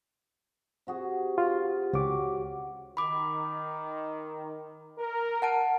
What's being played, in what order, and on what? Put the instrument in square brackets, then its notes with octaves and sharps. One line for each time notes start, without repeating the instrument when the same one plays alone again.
[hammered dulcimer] C3 F#4 G#4
[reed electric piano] F4
[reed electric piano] C#2 D6 [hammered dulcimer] F#4 G4 C#5
[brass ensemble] D#3 [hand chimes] B5 D6
[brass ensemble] A#4
[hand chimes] F#5 A5 D7